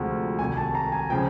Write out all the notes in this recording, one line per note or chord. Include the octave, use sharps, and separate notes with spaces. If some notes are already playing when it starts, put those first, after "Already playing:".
Already playing: D2 C3 F3 G#3
C2 C3 D#3 G#5
A5
A#5
G#5
C#3 F3 G5